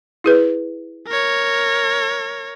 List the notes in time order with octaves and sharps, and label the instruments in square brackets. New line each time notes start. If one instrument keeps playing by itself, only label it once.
[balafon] E4 G#4 B4
[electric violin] A#4 C#5